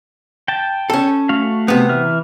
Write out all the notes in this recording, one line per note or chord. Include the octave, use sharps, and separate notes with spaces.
G5 A5
C#4 A4
A3 F#4 F5
C3 B3
E3 E5 F6